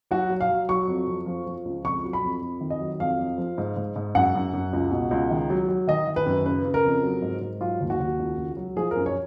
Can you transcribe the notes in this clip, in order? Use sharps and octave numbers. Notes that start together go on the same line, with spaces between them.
F#3 F#4
F#3
F5
F#3
F#3 C#6
F2
F2
F3
F3
C#2
F2 C#6
F#3
B5
F2
F2
D#3
D#5
F#3
F2 F5
F2
F3
G#2
G#2
G#2
F#2 F#5
F#2
F#2
C#2
B2
C#2
D#3
F#3
F#3
D#3 D#5
D#3
B4
F#2
C#3 B4
C#3
A#4
F2
F#3
G#2
G#2
F#3 F4
D#2
F#4
D#2
C#2
C#2
F#3
F3 G#4
A#4
F#2
C#5